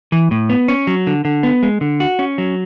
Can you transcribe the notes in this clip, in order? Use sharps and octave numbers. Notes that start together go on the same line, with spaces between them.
E3
A2
B3
C#4
F#3
D3
D3
B3
G#3
D3
F#4
C#4
F#3